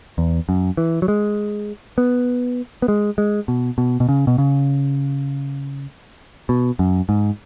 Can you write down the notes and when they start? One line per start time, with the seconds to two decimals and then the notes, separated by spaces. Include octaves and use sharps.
0.18 E2
0.49 F#2
0.77 E3
1.02 F#3
1.08 G#3
1.98 B3
2.82 B3
2.88 G#3
3.18 G#3
3.48 B2
3.78 B2
4.00 B2
4.09 C#3
4.27 B2
4.38 C#3
6.49 B2
6.79 F#2
7.09 G#2